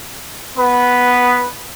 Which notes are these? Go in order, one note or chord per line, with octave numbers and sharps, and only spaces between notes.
B3 B4